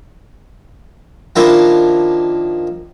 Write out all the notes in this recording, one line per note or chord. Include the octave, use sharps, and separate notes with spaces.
D#3 F3 A#3 D4 E4 F4